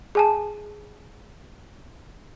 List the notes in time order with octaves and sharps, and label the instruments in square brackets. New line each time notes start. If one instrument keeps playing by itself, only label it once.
[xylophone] G#4 G#5 A5